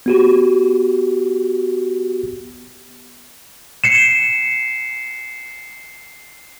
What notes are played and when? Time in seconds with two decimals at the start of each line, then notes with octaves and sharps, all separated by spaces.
0.06 B3 F#4 G4
3.84 C7 C#7 E7